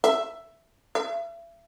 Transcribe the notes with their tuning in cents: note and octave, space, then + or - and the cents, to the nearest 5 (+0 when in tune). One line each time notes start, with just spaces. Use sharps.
E5 +10
E5 +40